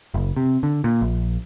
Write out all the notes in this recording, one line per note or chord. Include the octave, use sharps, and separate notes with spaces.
F#1
C3
D3
A#2
A#1